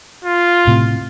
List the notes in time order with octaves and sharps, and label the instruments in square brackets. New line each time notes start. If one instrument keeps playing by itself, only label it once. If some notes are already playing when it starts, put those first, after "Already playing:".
[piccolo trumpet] F4
[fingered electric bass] A2 C3